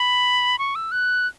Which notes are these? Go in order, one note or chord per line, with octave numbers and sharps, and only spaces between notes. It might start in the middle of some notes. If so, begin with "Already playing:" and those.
Already playing: B5
C#6
E6
F#6